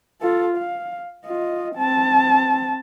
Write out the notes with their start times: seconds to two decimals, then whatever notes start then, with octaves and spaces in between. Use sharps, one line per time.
0.22 F4 A4
0.57 F5
1.25 F4 D#5
1.76 C4 A5